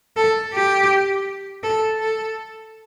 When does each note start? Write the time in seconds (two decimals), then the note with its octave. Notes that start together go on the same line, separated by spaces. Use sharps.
0.17 A4
0.54 G4
1.63 A4
2.00 A4